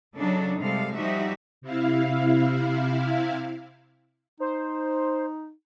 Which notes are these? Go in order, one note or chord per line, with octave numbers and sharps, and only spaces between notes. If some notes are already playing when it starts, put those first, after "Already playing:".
C#3 F#3 D4 D#4 A4
C3 G3 G#3 A4 F5
F3 G3 D#4 F#4 G4 E5
C3 E4 F5
D#4 C5